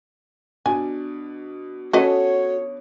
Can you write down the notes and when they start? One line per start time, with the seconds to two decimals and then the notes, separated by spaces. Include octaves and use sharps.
0.66 B2 D4 G#5
1.93 C#4 F#4 A4 B4 C#5 D#5